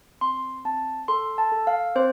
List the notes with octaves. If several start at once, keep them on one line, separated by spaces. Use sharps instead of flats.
C4 C6
C4 A5
A4 C6
A5
A4
F5
C4 C5